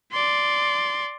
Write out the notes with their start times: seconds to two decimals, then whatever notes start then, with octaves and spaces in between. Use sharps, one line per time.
0.13 D5 C6